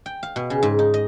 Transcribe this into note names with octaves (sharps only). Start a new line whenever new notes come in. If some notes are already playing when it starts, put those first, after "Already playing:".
G5
F5
B2
C#3
G#2
D#4
D#5